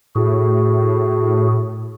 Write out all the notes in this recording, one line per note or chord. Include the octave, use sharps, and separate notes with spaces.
A2 F#4 G#4